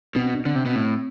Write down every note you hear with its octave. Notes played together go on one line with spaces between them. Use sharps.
B2 C4
D4
D3 C4
C3
B2
A2